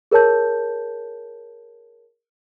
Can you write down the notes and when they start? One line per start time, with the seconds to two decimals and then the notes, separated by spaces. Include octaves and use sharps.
0.11 G#4 A#4 C#5 A5 G6